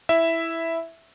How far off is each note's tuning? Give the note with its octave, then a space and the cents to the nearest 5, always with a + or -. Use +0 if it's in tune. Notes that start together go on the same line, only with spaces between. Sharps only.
E4 +0 E5 +0